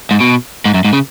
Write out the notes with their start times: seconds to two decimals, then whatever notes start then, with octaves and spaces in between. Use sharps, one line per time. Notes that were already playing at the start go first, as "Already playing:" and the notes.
0.11 G#2
0.20 B2
0.65 G#2
0.74 F#2
0.85 G#2
0.93 C#3